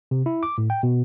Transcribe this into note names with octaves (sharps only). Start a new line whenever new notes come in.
C3
E4
D6
A2
G5
B2